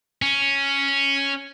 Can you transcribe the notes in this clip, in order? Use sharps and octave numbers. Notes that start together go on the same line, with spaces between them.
C#4